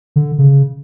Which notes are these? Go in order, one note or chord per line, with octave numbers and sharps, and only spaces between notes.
D3
C#3